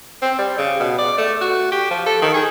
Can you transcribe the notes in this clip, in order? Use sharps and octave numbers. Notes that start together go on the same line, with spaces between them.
C4
G3
C#3
B2
D5
A3
F#4
G4
F3
A4
D#3
G#4